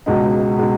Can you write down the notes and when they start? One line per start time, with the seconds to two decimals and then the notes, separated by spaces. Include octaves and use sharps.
0.06 C#2 B2 G#3 D#4
0.58 B2 G#3 D#4